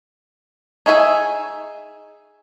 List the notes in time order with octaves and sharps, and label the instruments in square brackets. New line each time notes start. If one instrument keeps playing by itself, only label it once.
[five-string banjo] D#4 G#4 E5 F5 G#5